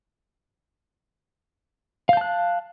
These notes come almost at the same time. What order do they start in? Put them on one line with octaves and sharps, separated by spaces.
F5 G6 A5 F#6